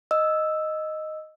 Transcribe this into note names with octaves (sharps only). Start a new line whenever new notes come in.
D#5 E6